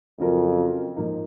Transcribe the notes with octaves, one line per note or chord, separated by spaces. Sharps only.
F2 C#3 F#3 C#4 F4 A#4
G#2 F3 A#3 D#4